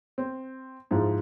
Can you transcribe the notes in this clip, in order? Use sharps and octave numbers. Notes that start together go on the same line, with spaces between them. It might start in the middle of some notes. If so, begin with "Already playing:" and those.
C4
G#2 F3 E4